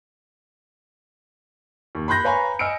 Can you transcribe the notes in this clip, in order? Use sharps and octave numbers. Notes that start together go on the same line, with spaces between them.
D#2
B5 C6 F#6 G6 A#6
B4 C#5 F5 G#5 A#5 B5
D#5 G#5 E6 F6 C#7 D7